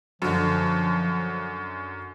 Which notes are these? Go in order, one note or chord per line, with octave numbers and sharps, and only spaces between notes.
F#2 D3 F3